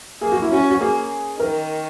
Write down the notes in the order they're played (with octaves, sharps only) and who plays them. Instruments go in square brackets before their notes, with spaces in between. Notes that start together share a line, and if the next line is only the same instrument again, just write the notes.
[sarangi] A#3 [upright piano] G#4
[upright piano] F#4
E4
[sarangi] C#4 [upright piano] F#4
[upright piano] F#4
[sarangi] A#3 [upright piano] G#4
[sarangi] D#3 [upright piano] A#4